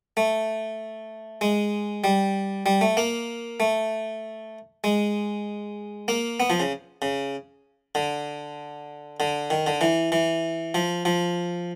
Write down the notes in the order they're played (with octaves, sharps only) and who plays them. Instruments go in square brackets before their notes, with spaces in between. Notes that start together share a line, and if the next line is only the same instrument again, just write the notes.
[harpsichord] A3
G#3
G3
G3
A3
A#3
A3
G#3
A#3
B3
F3
C#3
C#3
D3
D3
D#3
D3
E3
E3
F3
F3